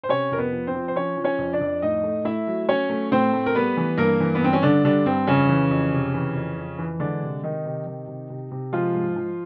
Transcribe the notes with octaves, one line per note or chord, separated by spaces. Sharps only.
C5
C3 C#4 C#5
F2 A#4
B3 B4
F3
C4 C5
F3
C5
F3 C#4 C#5
F3
C#4 C#5
F2
D4 D5
F2
A2 D#4 D#5
A3
A3 E4 E5
F#3
F#3 C#4 C#5
A3
A2 C4 C5
A3
A#4
G3 B3 B4
E3
G2 A#3 A#4
E3
B3
G2 C4
C#4
G2 D3 D4
D3 G3 D4
G2 C4
F2 C#3 C#4
E3
F2
C3
E3
F2
F2
E3
D3 G#3 D4
C3
C3 D#3 D#4
C3
D#3
C3
C3
C3
F3 G#3 F4
G#2
F3